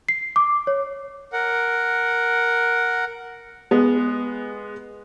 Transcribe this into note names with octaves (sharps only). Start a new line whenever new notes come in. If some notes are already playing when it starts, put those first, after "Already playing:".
C7
D6
C#5
A#4 F#5
G#3 B3